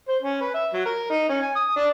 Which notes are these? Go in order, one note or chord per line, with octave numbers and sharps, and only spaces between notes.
C5
C#4
B4
E5
F#3
A#4
D#4
C#4
G#5
D#6
D4